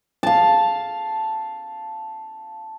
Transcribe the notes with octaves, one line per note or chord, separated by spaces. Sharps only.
F5 A5